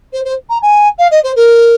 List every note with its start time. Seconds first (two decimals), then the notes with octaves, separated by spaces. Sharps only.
0.13 C5
0.24 C5
0.49 A#5
0.62 G#5
0.98 F5
1.11 D#5
1.23 C5
1.36 A#4